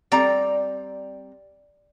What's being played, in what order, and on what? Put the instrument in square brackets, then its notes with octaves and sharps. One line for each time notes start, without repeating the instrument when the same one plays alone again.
[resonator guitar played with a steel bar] G3 C4 A#5 [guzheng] D5